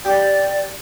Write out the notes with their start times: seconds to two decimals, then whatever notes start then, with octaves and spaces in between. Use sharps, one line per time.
0.05 G4 D5